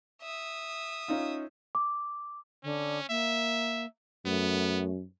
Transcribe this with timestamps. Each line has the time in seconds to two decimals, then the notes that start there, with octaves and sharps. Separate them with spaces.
0.22 E5 D#6
1.08 C#4 D#4 F4
1.75 D6
2.64 D3 C#4
3.09 A#3 E5
4.25 F#2 A3 B3